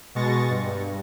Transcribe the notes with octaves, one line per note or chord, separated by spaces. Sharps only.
B2 G#3 C#6 A6 A#6
G2